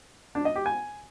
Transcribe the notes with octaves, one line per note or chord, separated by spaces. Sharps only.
D4
D#5
G4
G#5